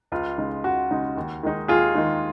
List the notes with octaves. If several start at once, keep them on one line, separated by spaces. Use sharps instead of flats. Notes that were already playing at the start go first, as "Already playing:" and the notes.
C#2 F4
C#3 G#3 D#4
C#2 F#4
C#3 G#3 D#4
D#2
D#3 G#3 D#4
D#2 F4 G#4
D#3 G#3 D#4